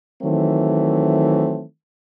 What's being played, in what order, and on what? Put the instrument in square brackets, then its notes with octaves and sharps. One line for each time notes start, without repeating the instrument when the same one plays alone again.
[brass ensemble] D#3 E3 F#3 A3 C4